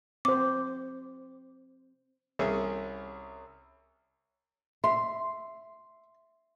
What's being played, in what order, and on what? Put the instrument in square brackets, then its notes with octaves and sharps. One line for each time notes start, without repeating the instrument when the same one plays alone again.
[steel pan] C4 C5 [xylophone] D6
[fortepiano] C2 C#4 G#4 E5
[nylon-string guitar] E5 [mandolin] C6